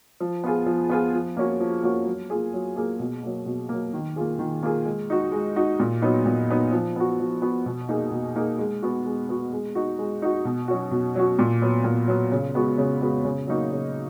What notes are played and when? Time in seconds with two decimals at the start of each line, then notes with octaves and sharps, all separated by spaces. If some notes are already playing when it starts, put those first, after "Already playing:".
0.20 F3
0.44 B3 F4 G#4
0.66 F3
0.89 B3 F4 G#4
1.14 F3
1.37 A#3 C#4 F#4
1.60 F3
1.83 A#3 C#4 F#4
2.06 F#3
2.30 A#3 F4 G#4
2.54 F#3
2.76 A#3 F4 G#4
2.99 B2
3.23 F#3 A#3
3.46 B2
3.69 F#3 A#3
3.93 D#3
4.16 A#3 F4 G#4
4.39 D#3
4.63 A#3 F4 G#4
4.85 G#3
5.10 D#4 F#4
5.32 G#3
5.56 D#4 F#4
5.80 A#2
6.02 F#3 B3 D#4
6.26 A#2
6.49 F#3 B3 D#4
6.72 F3
6.96 B3 F#4
7.20 F3
7.42 B3 F#4
7.66 B2
7.89 A#3 D#4 G#4
8.12 B2
8.36 A#3 D#4 G#4
8.59 G#3
8.82 B3 F#4
9.06 G#3
9.29 B3 F#4
9.53 G#3
9.75 D#4 F#4
9.99 G#3
10.22 D#4 F#4
10.45 B2
10.68 F#3 C#4 F#4
10.91 B2
11.15 F#3 C#4 F#4
11.39 A#2
11.62 F#3 B3
11.84 A#2
12.08 F#3 B3
12.32 C#3
12.55 G#3 B3 F#4
12.78 C#3
13.01 G#3 B3 F#4
13.25 C#3
13.47 F#3 A#3 D#4 F#4
13.72 C#3